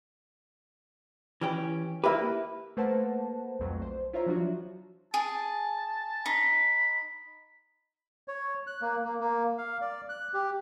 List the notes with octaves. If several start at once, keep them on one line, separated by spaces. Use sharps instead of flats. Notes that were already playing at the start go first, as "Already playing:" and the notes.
E3 C#4 G4
A#3 E4 G4 B4 E5
A3 A#3 B4 C5 F#5 A5
B1 F2 F#3 A3
C5
E4 F4 C5 C#5 E5 A#5
F3 F#3 D4 F4 F#4
G#4 A5
D#4 B5
C#5
F#6
A#3
A#3
A#3
F5
D5
F#6
G4